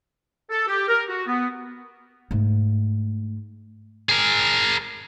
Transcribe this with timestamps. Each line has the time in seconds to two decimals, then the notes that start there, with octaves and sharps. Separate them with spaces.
0.50 A4
0.67 G4
0.88 A#4
1.09 F#4
1.27 B3
2.31 G#2 A3
4.09 G#4 A#4